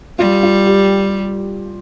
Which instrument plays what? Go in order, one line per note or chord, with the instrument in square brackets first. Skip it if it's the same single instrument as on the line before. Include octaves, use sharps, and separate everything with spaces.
[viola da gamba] G3 [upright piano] F4
[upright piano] F4
G4